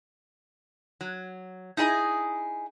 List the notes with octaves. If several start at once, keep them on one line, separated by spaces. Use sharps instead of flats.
F#3
D#4 E4 G#4 D#5 G#5